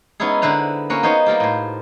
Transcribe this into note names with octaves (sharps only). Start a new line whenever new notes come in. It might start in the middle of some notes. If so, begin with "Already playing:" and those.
G#3 B3 C#4 D#4 E4 G#4
D3 E4 B4 C5 A#5
A#3 B3 C#4 F#4 A#4
B3 D#4 C5 C#5
G3 A#3 F4 G4
A2 C5